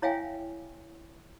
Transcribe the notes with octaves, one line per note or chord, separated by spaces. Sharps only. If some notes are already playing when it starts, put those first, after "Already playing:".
E4 C#5 E5 F5 G5 G#5